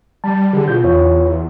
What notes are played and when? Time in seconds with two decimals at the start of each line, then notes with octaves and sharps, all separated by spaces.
0.24 G3 A5
0.53 D3 G4 G#4
0.68 B2 F4 G6
0.84 E2 F4 C#5